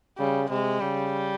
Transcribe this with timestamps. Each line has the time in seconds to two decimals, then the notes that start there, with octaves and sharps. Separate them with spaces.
0.18 C#3 G3
0.50 C3 G#3
0.80 C#3 G3